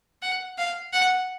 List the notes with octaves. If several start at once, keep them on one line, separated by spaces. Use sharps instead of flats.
F#5
F5
F#5